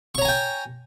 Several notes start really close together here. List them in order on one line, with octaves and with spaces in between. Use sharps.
C#6 C#5 A#5 G#5 G5